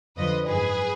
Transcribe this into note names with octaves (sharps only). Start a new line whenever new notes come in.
F2 D3 F3 B4 D#5
G#1 F#2 D#3 G#4 B4